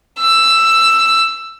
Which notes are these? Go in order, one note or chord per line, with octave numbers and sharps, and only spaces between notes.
E6